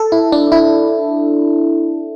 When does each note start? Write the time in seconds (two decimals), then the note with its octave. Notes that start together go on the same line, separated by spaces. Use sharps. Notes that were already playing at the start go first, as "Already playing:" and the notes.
Already playing: A4
0.12 E4
0.32 D4
0.52 E4